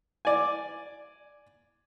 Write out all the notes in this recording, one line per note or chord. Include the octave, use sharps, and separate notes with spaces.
D5 G#5